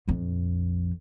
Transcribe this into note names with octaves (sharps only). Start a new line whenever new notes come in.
A#1 F2